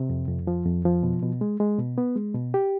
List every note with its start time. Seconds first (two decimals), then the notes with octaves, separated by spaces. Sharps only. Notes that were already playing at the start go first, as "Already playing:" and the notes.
Already playing: C3
0.10 F2
0.28 F2
0.47 F3
0.66 F2
0.85 F3
1.03 B2
1.22 B2
1.41 G#3
1.60 G#3
1.79 B2
1.98 B3
2.16 G#3
2.35 B2
2.54 G4